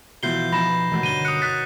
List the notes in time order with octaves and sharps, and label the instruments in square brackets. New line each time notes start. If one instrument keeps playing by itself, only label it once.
[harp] B2 E3 F3 [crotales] G6 C7 G7
[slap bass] F3 [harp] D#4 [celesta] B5 [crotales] A#6 E7
[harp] D#3 F#3 [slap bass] E3 A3
[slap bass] G2 D3 [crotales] D#7 G7
[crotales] D#6 C#7 [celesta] F#6
[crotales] F#6 B6 [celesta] A6